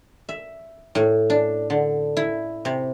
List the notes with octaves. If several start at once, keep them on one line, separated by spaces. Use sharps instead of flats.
E5
A2
D4
D3
E4
C3